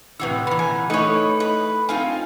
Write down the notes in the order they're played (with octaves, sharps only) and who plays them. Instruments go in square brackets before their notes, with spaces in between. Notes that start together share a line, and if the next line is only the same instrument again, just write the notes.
[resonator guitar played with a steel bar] A2 C3 E3 [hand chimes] B4 F#5 E6
[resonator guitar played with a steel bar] A#2 E3 [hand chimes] B5
[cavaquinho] G#5
[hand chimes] A3 A4 D#5 [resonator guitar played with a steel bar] D#4 E4 [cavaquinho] B4 C#5
[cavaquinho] B4
[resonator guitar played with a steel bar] C4 D#4 F4 [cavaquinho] F5 [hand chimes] G#5